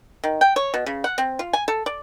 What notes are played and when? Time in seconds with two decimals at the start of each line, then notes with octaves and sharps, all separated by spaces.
0.24 D#3
0.41 G5
0.56 C#5
0.74 B2
0.86 C#3
1.04 F#5
1.18 C4
1.39 F4
1.53 G#5
1.68 A4
1.86 D5